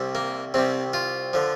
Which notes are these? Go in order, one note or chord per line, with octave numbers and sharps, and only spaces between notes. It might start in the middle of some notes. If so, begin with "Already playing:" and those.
Already playing: C2 C3 G3
A#3
C2 C3 G3 C4
F4
D3 F3